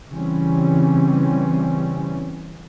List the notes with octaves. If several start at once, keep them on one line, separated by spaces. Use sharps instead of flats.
C#3 E3 G3 C4 C#4